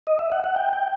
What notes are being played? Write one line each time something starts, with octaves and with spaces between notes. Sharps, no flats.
D#5
E5
F#5
F#5
G5
G5